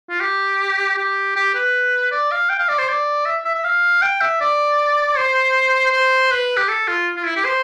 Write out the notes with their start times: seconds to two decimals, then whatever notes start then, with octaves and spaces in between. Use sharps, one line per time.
0.10 F4
0.21 G4
0.98 G4
1.36 G4
1.55 B4
2.12 D5
2.31 F5
2.50 G5
2.59 F5
2.69 D5
2.78 C5
2.89 D5
3.26 E5
3.45 E5
3.55 E5
3.64 F5
4.02 G5
4.21 E5
4.41 D5
5.17 C5
5.92 C5
6.31 B4
6.57 G4
6.69 A4
6.88 F4
7.16 F4
7.26 E4
7.37 G4
7.45 C5